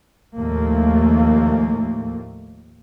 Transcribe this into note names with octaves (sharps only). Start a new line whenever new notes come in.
D#2 A2 F3 A3 A#3